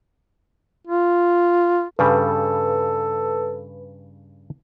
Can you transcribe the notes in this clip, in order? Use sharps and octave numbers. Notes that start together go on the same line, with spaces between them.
F4
G2 C#3 G3 A4 B4